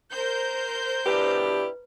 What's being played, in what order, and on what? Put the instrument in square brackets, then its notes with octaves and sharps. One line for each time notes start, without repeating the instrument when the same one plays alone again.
[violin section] A#4 C5 G6
[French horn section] D2 B2 D5 [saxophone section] D4 E4 G4 [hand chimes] B4